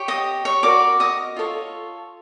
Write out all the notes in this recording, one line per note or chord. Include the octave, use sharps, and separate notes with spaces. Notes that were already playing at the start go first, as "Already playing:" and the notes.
Already playing: G4 C#5
D#5 D#6
C#5 C#6
F#4 A#4 D5 D6
D#5 D#6
F4 A4 C#5